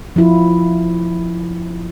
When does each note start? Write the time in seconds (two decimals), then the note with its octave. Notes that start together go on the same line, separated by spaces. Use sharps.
0.16 F3 E4 F4